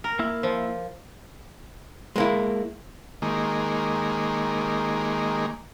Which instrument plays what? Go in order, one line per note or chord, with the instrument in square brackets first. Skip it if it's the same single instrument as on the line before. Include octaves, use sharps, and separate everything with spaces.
[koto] A#4
[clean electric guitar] A#3 E4 E5
[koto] F3
[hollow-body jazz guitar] G#3 A#3 E4
[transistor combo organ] D#3 G#3 A#3